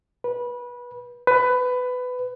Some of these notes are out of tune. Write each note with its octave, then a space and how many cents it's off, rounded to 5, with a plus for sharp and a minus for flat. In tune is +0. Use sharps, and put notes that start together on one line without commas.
B4 -20
B4 +20